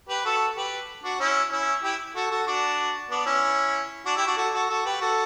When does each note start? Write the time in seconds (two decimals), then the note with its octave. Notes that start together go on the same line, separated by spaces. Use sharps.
0.09 G4 B4
0.25 F#4 A4
0.56 G4 B4
1.03 D4 F#4
1.20 C#4 E4
1.51 C#4 E4
1.83 E4 G4
2.16 F#4 A4
2.31 F#4 A4
2.47 D4 F#4
3.11 B3 D4
3.26 C#4 E4
4.05 D4 F#4
4.16 E4 G4
4.27 D4 F#4
4.37 F#4 A4
4.53 F#4 A4
4.69 F#4 A4
4.85 G4 B4
5.01 F#4 A4